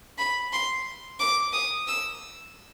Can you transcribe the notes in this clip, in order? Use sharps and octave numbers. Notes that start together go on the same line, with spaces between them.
B5
C6
D6
D#6
E6